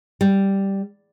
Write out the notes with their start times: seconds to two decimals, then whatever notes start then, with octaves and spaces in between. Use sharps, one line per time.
0.21 G3